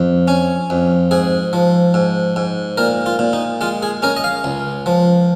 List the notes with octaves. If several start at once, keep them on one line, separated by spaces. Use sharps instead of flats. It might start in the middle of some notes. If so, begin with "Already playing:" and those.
Already playing: F2
C#4
F2
G#2 G#4
F3
G#2
G#2
A#2 A#4
F4
A#2
D#4
G#3 F4
G#4
C#4 A#4
D#5
F5
C#2
F3